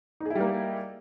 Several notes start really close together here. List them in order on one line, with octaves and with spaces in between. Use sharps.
D#4 G#4 E4 G3 A#3